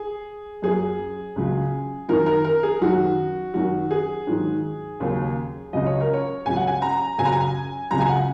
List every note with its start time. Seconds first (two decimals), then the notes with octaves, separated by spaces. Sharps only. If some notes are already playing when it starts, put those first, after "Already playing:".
Already playing: G#4
0.62 F#2 F#3 G#4
1.36 C#2 C#3 F#3
2.08 F#2 D#3 F#3 A#4
2.26 A#4
2.44 A#4
2.63 G#4
2.81 F#2 D#3 F#3 F#4
3.54 F#2 D#3 F#3 F#4
3.91 G#4
4.27 G#2 D#3 F#3
5.00 D#2 C#3 F#3
5.73 C#2 C#3 F#3 D#5
5.86 C#5
6.00 A#4
6.13 C#5
6.46 C#2 C#3 F#3 G#5
6.56 F#5
6.67 G#5
6.82 A#5
7.18 F#2 C#3 F#3 G#5
7.25 A#5
7.32 G#5
7.91 C#2 C#3 F#3 A#5
8.01 G#5
8.09 F#5